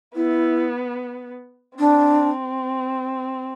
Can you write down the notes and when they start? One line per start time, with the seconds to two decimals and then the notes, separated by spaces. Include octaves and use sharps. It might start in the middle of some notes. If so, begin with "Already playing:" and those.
0.15 B3 E4
1.78 C4 D4